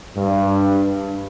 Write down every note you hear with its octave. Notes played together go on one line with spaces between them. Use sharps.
G2